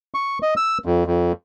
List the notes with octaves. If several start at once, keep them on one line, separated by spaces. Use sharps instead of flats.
C#6
D#5
E6
F2
F2